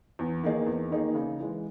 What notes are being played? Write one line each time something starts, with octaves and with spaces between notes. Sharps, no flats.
E2
D#3 A#3 D#4 G#4
E2
D#3 A#3 D#4 G#4
C#3
E3 G#3